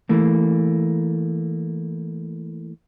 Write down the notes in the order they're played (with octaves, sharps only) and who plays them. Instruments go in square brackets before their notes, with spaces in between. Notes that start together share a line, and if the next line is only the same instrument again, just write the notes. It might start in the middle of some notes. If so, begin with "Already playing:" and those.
[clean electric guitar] E3 A3 A#3